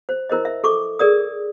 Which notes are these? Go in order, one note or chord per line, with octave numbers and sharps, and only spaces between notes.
C5
E4 A#4 C5 D#5
E5
A4 C#6 D6
G#4 A#4 D5 D#6